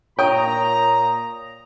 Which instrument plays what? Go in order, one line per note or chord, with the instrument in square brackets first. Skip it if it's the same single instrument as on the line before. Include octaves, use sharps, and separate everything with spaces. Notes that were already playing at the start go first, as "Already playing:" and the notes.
[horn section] A#2 A#5 [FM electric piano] C#5 D#6 [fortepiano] G5